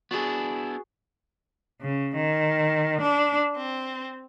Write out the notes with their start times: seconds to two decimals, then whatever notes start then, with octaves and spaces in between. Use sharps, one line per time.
0.11 B3 D4 E4 F#4 G#4
1.82 C#3
2.16 D#3
3.03 D4
3.55 C4